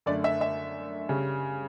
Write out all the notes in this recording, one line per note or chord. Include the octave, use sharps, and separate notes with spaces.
F#2 D3 A3 D5
E5
E5
C#3 G3 C#4